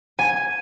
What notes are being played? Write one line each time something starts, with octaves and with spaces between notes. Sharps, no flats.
G#5